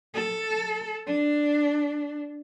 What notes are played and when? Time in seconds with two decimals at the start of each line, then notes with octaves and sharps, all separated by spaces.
0.15 A4
1.07 D4